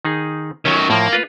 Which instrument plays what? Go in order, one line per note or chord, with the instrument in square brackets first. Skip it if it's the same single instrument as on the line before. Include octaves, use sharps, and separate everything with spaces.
[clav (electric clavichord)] D#3 D#4 G#4
[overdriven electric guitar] D#3 F#3 [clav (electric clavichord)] C#4 G5 G#5
[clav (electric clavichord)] A2 F3 [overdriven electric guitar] A#3
[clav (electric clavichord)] F4 B4